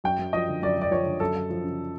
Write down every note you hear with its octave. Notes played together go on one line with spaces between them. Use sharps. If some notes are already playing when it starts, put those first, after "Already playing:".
F#2 G5
F#2
F3 D#5
D3
F#2 D5
F#2 D5
F3 C#5
D3
F#2 A4
F#2
F3
C#3